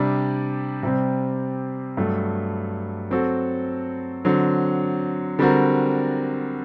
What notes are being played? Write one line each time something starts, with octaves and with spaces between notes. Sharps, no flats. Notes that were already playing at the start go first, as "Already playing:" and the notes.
Already playing: C3 G3 D4
C3 G3 C4
G2 F#3 A3
F#3 C4 F#4 A4
D3 F#3 C4
D3 G3 C4 F#4 A#4